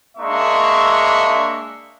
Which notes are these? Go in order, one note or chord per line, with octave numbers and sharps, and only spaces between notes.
G#3 A#3 D4 E5 C#6